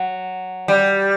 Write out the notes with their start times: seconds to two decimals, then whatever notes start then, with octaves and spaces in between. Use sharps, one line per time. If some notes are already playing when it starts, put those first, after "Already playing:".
Already playing: F#3
0.68 G3